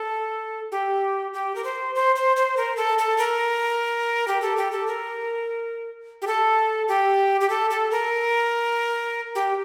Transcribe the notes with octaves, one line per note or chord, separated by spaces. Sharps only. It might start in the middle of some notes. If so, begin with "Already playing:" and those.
Already playing: A4
G4
G4
A#4
C5
C5
C5
C5
A#4
A4
A4
A#4
G4
A4
G4
A4
A#4
G4
A4
G4
G4
A4
A4
A#4
G4